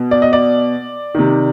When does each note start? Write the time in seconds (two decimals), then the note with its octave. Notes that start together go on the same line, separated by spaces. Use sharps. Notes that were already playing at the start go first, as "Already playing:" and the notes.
Already playing: B2
0.11 D5
0.22 D#5
0.33 D5
1.15 C3 D#3